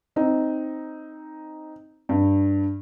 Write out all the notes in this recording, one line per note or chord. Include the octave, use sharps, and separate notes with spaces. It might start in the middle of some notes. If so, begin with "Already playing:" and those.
C4 D#4
G2